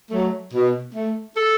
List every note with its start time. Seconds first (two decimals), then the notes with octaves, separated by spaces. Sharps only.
0.11 F#3 A3
0.54 B2
0.95 A3
1.37 A4